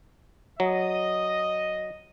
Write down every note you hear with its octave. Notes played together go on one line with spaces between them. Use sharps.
F#3 D#5